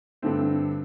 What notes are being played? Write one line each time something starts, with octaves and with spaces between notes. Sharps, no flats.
G2 D3 A3 C4